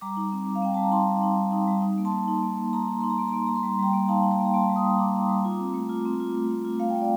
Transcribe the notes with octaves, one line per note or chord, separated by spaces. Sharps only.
G3 A#5 D6
D#4
C4
G3
F5
C4 G5
G3 A5
A#5
D#4 A5 C6
G3
D#4
G3
D#4
G3
D#4
A#3
A5 C6
A#3
D#4
A#3
A#3
D#4 A#5
C6
D#4 A#5
D#4 C6
A#5
A#3 C6
A#5
A#3 C6
A#3 A#5
C6
G3 A#5
C6
G3 G5 A#5
A#3
D#4 F5 A5
D#4
G5 A#5
A#3
A#5
A#3 A5 C6
G3
C6 D#6
G3
D#4 A#5 D6
G3
G3
F4
C4
A3
F4
C4
F4
A3
A3
F4
A3 F5
A3 G5
D5